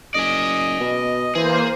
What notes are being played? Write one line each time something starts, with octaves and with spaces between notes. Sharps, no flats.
F#1 D5 D#5 G#5
B2
E3 A#3 G#4 C5